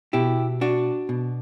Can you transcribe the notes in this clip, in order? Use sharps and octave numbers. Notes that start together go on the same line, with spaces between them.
B2 E4 G4
D4 F#4
B2